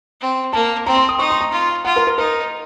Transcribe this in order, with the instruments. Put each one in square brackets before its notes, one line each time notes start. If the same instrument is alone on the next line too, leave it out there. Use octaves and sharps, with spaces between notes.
[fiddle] C4
[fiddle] A#3 [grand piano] A5
[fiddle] C4 [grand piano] A#5
[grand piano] C6
D#6
[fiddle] D#4 [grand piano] C#6
[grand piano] C6
A#5
[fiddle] F4
[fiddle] F4 [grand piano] F#5
[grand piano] A#4
A#4
[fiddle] D#4 [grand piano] A#4